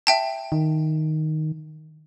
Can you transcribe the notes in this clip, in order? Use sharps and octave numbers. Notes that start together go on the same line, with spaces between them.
E5 G5 A5
D#3